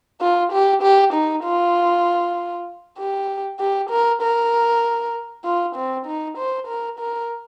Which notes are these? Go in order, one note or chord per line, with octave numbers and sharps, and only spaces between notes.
F4
G4
G4
D#4
F4
G4
G4
A#4
A#4
F4
C4
D#4
C5
A#4
A#4